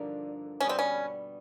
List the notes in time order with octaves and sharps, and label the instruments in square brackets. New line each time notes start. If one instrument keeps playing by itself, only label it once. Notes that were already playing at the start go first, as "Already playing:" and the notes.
Already playing: [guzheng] G2 D3 F3 A#3 D#4
[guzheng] B2 G3 B3 [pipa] C#4
[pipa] C4
C#4